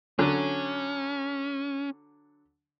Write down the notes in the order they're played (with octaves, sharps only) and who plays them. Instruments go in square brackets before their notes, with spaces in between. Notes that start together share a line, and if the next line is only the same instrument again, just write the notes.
[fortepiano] D3 F#3 [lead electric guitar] C#4